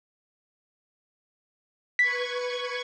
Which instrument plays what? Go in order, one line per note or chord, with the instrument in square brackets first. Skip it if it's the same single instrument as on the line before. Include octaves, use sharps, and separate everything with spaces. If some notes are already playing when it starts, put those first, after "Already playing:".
[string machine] B4 C#6 G#6 [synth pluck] B6